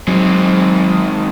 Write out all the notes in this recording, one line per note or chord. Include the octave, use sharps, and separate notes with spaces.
F#3 G#3 C4 D#4